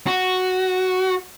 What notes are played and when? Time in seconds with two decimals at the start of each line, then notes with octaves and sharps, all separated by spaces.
0.07 F#4